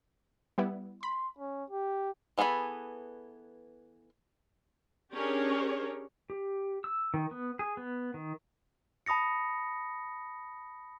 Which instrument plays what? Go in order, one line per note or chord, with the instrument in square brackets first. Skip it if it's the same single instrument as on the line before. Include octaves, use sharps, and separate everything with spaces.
[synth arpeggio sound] G3 B3 E4
[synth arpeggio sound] B5 [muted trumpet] C6
[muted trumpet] C#4
G4
[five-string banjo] E3 B3 G#4 A4 B5
[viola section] C#4 D4 G4 G#4 A#4 C#5
[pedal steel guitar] G4
E6
D#3
B3
G#4
B3
D#3
[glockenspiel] A5 B5 D#6 A#6 C#7